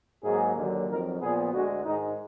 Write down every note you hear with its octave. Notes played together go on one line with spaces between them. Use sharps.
G#2 F#3 A#3 G#4
D#2 D3 F#3 A#3
F2 D#3 F#3 A#4
A#2 F3 B3 G#4
D2 D3 G#3 F#4
G#2 D#3 G#3 D#4